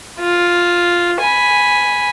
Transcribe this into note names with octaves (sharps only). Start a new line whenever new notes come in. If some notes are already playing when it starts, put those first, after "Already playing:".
F4
G#5 B5